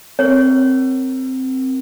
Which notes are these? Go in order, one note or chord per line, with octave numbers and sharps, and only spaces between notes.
C4 A#4 C#5